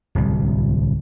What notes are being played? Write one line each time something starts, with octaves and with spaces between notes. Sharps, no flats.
D1 C2